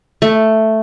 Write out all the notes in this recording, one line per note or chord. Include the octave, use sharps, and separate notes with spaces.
A3